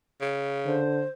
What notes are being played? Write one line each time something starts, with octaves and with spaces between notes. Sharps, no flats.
C#3
D3 C5